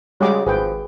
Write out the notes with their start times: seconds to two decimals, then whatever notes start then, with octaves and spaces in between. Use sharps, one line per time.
0.21 C#3 G3 G#3 F#4 G#4 D6
0.46 G#1 F3 G#4 B4 G5